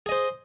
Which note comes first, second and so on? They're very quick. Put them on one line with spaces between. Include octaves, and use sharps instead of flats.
G#4 D#5 C5